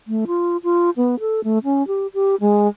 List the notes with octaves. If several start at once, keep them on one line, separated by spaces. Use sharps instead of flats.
A3
F4
F4
B3
A4
A3
C#4
G4
G4
G#3